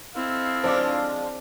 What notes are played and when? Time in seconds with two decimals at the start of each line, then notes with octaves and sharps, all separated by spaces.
0.15 C4 E4 A4 D#5 F5
0.63 F3 G#3 D4 C5 D5 D6